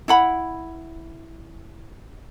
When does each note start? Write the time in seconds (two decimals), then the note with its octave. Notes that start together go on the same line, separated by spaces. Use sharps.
0.08 E4 F#5 B5